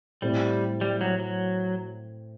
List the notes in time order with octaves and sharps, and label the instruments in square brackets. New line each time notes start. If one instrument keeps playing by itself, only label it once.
[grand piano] A2 A3 C4 [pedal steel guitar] G3
[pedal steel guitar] G3
F#3
F#3